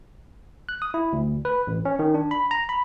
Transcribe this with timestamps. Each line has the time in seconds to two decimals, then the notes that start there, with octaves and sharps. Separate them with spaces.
0.69 F#6
0.82 D#6
0.94 E4
1.13 D2
1.45 B4
1.67 A1
1.85 C#4
1.99 D#3
2.14 D4
2.31 B5
2.51 A#5
2.69 B5